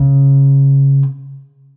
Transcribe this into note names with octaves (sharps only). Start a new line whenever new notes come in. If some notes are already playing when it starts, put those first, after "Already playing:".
Already playing: C#3